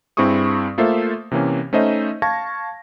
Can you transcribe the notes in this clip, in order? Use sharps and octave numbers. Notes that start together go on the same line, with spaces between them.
G2 C4 E4 G#4 C#6 D#6
A3 A#3 F4 A4 C5 E5
C3 E3 A#3 C#4
A3 C#4 D#4 C5 D#5 E5
F5 A5 C#6 G#6 A#6